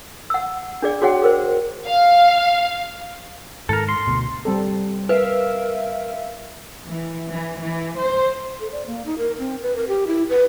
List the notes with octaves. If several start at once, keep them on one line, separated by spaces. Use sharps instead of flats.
F#5 E6
D4 G#4 D5
F#4 G#4 C#5 F#5 G5
G#4 A#4 C5
F5
G#2 D#3 A4 A#4
C6
D2 B2
G3 C4 A4
A#4 B4 E5 F5
E3
E3
E3
C5
A4
D5
A#3
D#4
A#4
C4
B4
A#4
G4
E4
B4